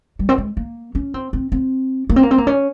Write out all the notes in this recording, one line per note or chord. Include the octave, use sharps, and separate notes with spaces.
G3
C4
G#3
A#3
C#4
C4
C4
C4
A#3
C4
A#3
C4
A#3
C#4